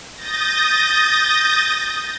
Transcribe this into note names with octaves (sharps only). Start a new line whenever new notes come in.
D#6 G6 A6 A#6